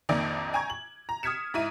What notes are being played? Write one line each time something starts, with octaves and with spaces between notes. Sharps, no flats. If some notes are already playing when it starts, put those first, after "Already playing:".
A#1 F2 D#3 A#3 D5 D7
G5 G#5 A#5 C#6 G#6
F#7
A#5
D#6 F6 G#6 B6 C#7 E7
G#2 E4 D#7